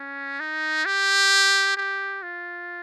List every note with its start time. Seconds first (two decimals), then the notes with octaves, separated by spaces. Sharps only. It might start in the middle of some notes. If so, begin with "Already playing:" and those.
Already playing: C#4
0.40 D#4
0.85 G4
1.77 G4
2.22 F4